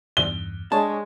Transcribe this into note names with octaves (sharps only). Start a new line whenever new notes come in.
E2 G2 G7
G#3 D4 C#5 G#5 A5